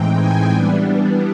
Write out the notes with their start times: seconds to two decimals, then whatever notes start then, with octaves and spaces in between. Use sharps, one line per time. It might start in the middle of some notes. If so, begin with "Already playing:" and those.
Already playing: A2 E3 G#3 C4 D#4 G5
0.16 G#5
0.51 E3 G3 B3 D4